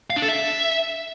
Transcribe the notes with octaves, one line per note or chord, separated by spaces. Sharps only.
F5
D4
A4
E5